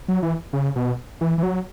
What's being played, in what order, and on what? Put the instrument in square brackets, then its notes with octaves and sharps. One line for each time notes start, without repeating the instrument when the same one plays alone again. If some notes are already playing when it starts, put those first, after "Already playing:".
[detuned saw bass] F#3
E3
C#3
B2
E3
E3
F#3